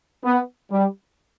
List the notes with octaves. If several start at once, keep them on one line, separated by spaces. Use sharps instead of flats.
B3
G3